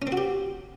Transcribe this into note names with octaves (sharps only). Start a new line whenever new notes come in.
C#4
C4
F#4
G4